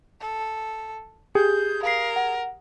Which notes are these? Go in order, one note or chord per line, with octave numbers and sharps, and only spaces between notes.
A4
G4 G#4 G6
A#4 F5 C7
F#5